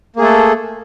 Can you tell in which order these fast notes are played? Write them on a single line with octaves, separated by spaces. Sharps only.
A#3 G#4 A3 A4